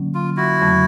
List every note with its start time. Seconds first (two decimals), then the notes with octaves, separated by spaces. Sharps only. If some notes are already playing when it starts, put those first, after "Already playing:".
Already playing: D3 F#3 A#3 C#4
0.14 F4
0.37 E4 F#4
0.60 F2 C#3 F#3 A3